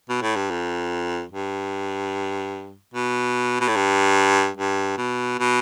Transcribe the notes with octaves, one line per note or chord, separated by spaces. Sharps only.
B2
A2
G2
F2
G2
B2
B2
A2
G2
G2
B2
B2